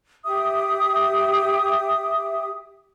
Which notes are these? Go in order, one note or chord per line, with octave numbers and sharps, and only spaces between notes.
G4 E5 D#6